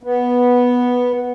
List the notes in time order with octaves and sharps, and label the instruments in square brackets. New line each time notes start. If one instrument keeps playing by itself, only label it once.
[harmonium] B3